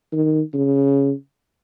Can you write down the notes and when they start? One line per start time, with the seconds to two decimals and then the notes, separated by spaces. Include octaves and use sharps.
0.13 D#3
0.54 C#3